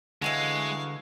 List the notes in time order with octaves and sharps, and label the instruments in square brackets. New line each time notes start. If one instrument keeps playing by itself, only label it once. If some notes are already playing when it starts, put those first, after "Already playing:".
[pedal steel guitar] D3 C#5 [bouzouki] E3 D#4 F#4 [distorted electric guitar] G#3 [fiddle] F5